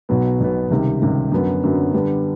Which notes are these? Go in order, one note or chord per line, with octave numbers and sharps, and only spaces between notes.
B1 B2 F#3 B3
B1 B2 F#3 B3
C#2 C3 D#3 G3
C#2 C3 D#3 G3
F#2 D3 F#3 B3
F#2 D3 F#3 B3
D3 G3 B3 D4